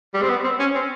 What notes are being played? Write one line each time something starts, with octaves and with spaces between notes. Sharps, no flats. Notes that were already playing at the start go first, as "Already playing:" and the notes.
G3
C4
B3
C4
C#4
C4